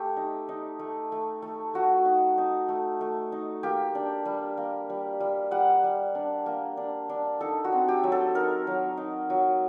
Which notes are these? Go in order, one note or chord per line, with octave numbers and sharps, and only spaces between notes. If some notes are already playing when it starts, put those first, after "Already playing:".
Already playing: A3 G4
D#4
D#4
A3
A3
A3
A3 F#4
D#4
D#4
A3
A3
D#4
A#3 G4
D4
G3
A#3
G3
G3
G3 F#5
G3
D4
A#3
D4
D4
D#4 A4
F#4
C4
G4
F#3
A4
D#4 A#4
F#3
D#4
F#3